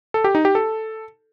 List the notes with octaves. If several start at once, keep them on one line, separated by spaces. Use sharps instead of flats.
A4
G4
D#4
G4
A4